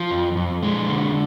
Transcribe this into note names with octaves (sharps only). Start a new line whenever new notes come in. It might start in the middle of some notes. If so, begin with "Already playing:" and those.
Already playing: F3
F2
F2
G#3
D3